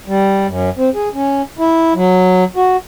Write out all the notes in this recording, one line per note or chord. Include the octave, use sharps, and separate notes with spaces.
G3
F#2
C4
G#4
C#4
E4
F#3
F#4